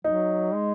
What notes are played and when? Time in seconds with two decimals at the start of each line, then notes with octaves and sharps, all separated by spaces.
0.04 F#3 D#4
0.54 G#3